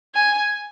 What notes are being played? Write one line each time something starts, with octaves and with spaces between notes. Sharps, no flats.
G#5